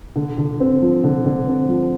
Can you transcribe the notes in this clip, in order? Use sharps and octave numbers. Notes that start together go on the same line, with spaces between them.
D3
D3
C4
F3
D3
D3
C4
F3